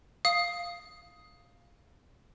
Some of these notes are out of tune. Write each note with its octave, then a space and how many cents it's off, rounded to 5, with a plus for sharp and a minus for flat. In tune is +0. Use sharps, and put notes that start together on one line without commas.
F5 +0 D#6 +10